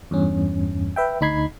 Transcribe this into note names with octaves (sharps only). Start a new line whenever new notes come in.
E2 G2 C#4
B4 E5 G5
D2 D#4 B5 G#6 C7